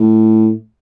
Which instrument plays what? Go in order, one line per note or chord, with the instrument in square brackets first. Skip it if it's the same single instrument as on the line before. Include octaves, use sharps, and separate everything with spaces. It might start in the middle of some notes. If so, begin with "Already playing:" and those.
Already playing: [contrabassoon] A2